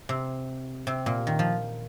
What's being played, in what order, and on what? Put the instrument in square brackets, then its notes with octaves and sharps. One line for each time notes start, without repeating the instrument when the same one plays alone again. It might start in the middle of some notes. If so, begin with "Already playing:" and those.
[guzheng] C3
C3
A#2
D#3
F3